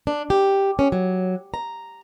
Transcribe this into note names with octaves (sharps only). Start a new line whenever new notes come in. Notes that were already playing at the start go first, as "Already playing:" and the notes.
D4
G4
C#4
F#3
A#5